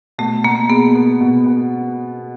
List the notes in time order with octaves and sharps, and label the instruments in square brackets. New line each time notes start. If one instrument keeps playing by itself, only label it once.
[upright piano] B2 [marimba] A3
[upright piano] B2 [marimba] A#3
[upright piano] G#3 [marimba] B3
[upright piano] B3
B2
B3